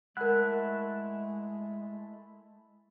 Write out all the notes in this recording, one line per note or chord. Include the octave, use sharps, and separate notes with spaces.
G#3 A3 E4 A#4 F#5 F#6